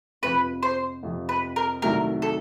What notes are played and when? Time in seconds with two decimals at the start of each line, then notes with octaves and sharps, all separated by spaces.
0.22 F2 C3 F3 B4
0.63 C5
1.03 F2 C3 F3
1.29 B4
1.56 A#4
1.82 C2 C3 D#3 F#3 A3 A#4
2.22 A4